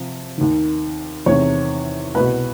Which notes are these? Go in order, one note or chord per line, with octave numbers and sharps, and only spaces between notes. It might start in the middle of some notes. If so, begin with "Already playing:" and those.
Already playing: C3 F3
D#2 D#3
E2 C3 D#3 C#5
C2 B2 B4